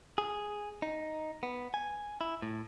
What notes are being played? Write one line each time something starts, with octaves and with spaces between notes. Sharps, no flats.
G#4
D#4
B3
G#5
E4
A2